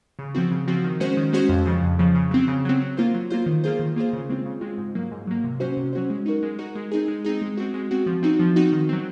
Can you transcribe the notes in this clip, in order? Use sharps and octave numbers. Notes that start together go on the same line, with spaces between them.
C#3
F3 C4 F#4
C#3
F3 C4 F#4
D#3
G#3 C#4 F#4 C5
D#3
G#3 C#4 F#4 C5
F2
C#3 F3
F2
C#3 F3
C#3
F#3 C4
C#3
F#3 C4
F#3
A#3 F4 C5
F#3
A#3 F4 C5
D#3
A#3 F4 G#4 C5
D#3
A#3 F4 G#4 C5
C#3
G#3 C4 F4
C#3
G#3 C4 F4
G#2
F#3 A#3
G#2
F#3 A#3
C3
F#3 C#4 F#4 C5
C3
F#3 C#4 F#4 C5
G#3
D#4 F#4 A#4
G#3
D#4 F#4 A#4
G#3
C4 D#4 G#4
G#3
C4 D#4 G#4
G#3
C4 F#4
G#3
C4 F#4
F3
C4 D#4 F#4
F3
C4 D#4 F#4
D#3
F#3 C4